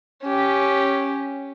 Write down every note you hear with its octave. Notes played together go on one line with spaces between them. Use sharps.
C#4 G4